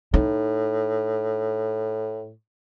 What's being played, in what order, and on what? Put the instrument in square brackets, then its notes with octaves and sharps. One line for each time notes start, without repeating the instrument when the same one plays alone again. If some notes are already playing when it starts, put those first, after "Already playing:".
[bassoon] A2 [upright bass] D#4